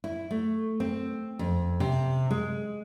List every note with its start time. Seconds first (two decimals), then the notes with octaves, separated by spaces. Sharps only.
0.04 E4
0.31 A3
0.80 C4
1.39 F2
1.80 C3
2.31 G#3